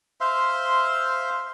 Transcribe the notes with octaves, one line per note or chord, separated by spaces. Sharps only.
C5 E5 F5 C6